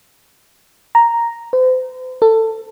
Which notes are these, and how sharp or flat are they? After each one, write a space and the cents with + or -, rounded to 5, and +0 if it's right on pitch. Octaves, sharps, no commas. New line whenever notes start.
A#5 +0
C5 -40
A4 +20